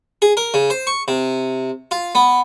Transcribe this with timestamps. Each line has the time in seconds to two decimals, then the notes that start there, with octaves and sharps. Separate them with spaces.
0.22 G#4
0.37 A#4
0.54 C#3
0.70 C5
0.87 C#6
1.08 C3
1.91 F4
2.15 B3